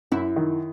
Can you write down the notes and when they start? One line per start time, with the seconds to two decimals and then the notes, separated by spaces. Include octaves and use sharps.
0.12 F#2 E4
0.36 D#3